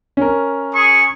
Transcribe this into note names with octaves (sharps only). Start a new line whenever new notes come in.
C#4 A#4
G#4 C#6